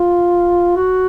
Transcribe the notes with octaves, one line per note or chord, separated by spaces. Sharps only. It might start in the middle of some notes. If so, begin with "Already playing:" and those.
Already playing: F4
F#4